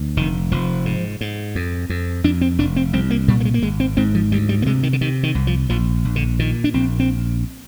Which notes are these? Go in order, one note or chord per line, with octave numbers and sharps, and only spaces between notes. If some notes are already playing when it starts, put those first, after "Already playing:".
Already playing: D2
F1 D#3
F1 F3
G#2
G#2
F2
F2
F2 D4
C4
F1 D4
C4
C2 C4
A#3
A#2 G3
A#3
G#3
A#3
G#1 G#3
C4
G#2 C4
F3
D2 G3
G3
A#3
C3 G#3
D#3
D3
C3 D#3
D#3
C2
F3
A#1 F3
A#1
D3
A#2 D#3
D4
A#1 C4
C4